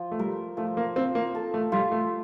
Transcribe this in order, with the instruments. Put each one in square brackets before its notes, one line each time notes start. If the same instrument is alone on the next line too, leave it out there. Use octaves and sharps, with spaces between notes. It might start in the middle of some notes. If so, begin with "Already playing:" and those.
Already playing: [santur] F3
[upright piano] A3
[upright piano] G3 [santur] A#4
[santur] F3 [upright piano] A3
[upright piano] A#3
[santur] F3 [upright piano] C4
[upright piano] A#3
[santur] A4
[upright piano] A3
[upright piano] G3 [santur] F4
[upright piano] A3